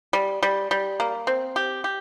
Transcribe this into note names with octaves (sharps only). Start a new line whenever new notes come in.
G3
G3
G3
A#3
C4
G4
G4